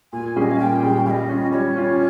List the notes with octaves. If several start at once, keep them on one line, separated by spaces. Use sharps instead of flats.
A#2 G#5
G3 C#4 G#4
D#5
F5
A#2 G5
G3 C#4 G#4
G3 D#5 F5
C#4 F4
G3 C#5
C#4 F4